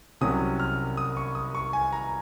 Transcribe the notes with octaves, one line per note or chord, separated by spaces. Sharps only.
C2 C3 F#3 C#4 D#6
F6
D#6
C#6
D#6
C#6
G#5
A#5